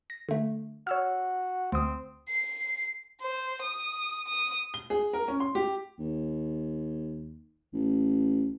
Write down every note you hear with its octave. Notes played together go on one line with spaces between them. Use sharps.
A#6
D3 A3
F#4 C#5 E6 F6
D2 C4 D#6
C7
C5
D#6
D#6
G7
G#4
A#4
C#4
C6
G4
D#2
A1